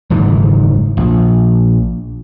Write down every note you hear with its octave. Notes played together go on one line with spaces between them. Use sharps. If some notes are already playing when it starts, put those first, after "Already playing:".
F#1 G#2 D#3 E3
A#1